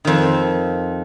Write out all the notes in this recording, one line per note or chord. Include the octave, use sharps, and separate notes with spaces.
F2 D#3